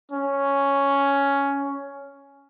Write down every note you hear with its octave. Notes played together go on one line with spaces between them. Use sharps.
C#4